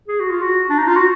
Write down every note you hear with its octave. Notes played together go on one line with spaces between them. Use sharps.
G#4
F#4
F4
F#4
D4
D#4
F4
F#4